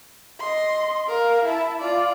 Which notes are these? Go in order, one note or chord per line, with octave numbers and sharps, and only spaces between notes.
D#5 C6
A#4 F5
E4 A5
F4 D5